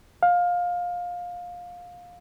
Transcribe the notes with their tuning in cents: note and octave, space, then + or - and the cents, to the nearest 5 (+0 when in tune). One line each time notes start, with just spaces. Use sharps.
F5 +20